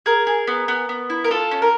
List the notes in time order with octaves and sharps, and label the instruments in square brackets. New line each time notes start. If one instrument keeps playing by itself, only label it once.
[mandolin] G#4 A#4
G#4
B3
B3
B3
E4
A#4
F4 A4
C#4
A#4